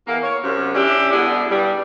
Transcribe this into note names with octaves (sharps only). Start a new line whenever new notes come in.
E2 E3 A#3
C#5
F#2 C3
C#4 D4 E4 G4
B2 D3 G3 E4 G#4
G2 G3